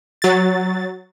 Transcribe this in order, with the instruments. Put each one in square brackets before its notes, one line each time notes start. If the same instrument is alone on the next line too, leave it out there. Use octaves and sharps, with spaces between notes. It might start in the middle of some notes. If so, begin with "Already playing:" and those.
[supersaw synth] F#3 A6